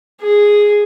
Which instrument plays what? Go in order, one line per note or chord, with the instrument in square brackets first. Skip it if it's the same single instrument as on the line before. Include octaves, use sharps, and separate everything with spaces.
[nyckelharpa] G#4